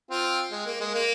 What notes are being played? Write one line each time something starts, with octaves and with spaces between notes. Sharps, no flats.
C4 F4
G#3
A#3
G#3
A#3